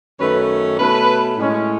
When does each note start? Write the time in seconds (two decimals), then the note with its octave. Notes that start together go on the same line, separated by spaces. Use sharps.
0.20 F#2 D#3 A3 C#4 B4
0.79 B2 A3 C#4 B4
1.37 A2 G#3 C#4